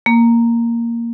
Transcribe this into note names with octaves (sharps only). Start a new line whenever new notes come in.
A#3